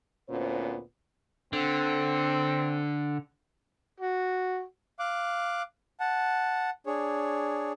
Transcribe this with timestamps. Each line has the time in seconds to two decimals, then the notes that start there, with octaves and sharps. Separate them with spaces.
0.29 D2 A#2 B3 C#4 C5
1.53 D3 C4
4.00 F#4
4.99 F5 D6 F#6
6.00 F#5 A5
6.86 D4 G#4 C#5